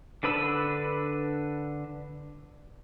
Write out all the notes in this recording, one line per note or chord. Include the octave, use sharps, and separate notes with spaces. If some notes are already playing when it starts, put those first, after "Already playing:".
D3 D4 B4 B5 E6